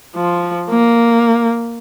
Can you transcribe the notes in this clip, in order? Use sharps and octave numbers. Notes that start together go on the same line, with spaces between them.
F3
A#3